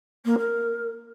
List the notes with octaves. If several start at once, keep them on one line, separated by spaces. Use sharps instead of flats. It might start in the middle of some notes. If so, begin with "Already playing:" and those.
A#3
A#4